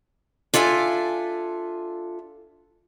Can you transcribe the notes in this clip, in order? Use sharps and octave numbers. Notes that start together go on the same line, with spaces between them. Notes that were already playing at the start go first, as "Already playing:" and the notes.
D4 F4 A4 E5 G#5